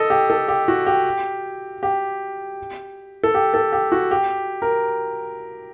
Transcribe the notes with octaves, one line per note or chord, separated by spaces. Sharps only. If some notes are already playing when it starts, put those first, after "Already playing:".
Already playing: A4 D#5
G4
A4
G4
F#4
G4
G4
A4
G4
A4
G4
F#4
G4
A#4